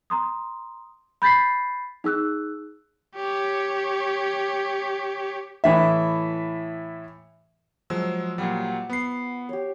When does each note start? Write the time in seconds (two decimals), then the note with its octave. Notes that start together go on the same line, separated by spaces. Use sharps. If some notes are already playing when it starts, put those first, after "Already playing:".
0.10 A#5 C6 D#6
1.22 B5 G6 A6 B6 C7
2.04 D#4 G#4 E6 F#6
3.15 G4 C#5
5.64 A2 E3 E5
7.90 F3 F#3 G#3 E6
8.38 A#2 F#3 G3 F#5
8.89 B3 C7
9.49 G4 C#5